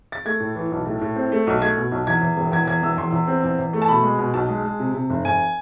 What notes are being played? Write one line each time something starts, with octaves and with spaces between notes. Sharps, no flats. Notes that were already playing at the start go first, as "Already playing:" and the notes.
A6
A3 G#6
A2
E3
B1
A2
A2
C4
A3
B1
A3 G#6
B2
B1
E2 G#6
E2
E1
E2 G#6
E2 G#6
E1 E6
E2 C6
E2
C4
E2
E2
A3
A5
B2 B5
G#3
B2
B1 A5
G#3
G#3
C3
C3
F1
F1 G#5